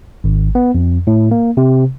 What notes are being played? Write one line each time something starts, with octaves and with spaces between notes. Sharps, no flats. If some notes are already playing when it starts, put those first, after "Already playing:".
G#1
B3
F2
A2
A#3
C3